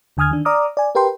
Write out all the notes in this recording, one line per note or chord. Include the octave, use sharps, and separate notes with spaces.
D#2 D3 G#5 D#6 F6 G#6
D#3 D4
D5 A#5 D6 D#6 F6
D5 G#5
G4 A#4 B4 G5 C6